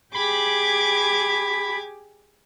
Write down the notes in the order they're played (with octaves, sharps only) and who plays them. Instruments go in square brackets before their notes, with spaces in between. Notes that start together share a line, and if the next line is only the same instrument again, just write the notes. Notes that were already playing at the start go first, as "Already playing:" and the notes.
[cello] G4 G#4 [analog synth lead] B5 [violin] D6 G#6